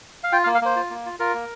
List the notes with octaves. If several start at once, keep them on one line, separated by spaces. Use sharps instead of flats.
F5
F4 G5
F5
A#3
F5
A#3 C5
F4
A#3
F4
F4 A#4
A#3